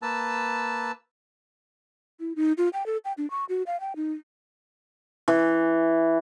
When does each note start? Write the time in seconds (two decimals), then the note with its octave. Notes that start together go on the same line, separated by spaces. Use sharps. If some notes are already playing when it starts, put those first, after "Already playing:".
0.02 A#3 B4 A5 E6
2.20 E4
2.36 D#4
2.58 F4
2.73 G5
2.86 A4
3.05 G5
3.18 D4
3.30 C#6
3.49 F#4
3.67 F5
3.81 G5
3.96 D#4
5.28 E3